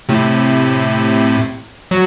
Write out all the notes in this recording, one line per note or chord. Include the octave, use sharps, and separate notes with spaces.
A2 C3
F#3